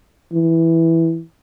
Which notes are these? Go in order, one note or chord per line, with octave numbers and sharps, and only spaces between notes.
E3